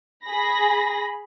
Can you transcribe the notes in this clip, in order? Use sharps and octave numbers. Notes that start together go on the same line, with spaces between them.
G#4 B5 A#6